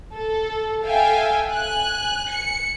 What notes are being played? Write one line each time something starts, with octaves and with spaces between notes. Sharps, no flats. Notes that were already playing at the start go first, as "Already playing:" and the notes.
A4
A4 E5 F5 G5 G#5
G#5 F#6
C#7